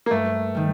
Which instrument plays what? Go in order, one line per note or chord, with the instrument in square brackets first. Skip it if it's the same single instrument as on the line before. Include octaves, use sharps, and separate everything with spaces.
[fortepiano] A#3
[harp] G2 [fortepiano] A3
[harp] D#3 G3